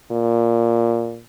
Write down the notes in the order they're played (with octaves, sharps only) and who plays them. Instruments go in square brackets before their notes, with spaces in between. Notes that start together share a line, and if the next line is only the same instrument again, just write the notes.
[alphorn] A#2